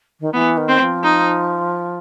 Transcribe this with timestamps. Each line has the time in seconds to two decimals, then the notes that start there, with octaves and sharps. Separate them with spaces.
0.20 D#3
0.33 E3 B3
0.57 D#3
0.68 C4
0.80 F3
1.03 D#4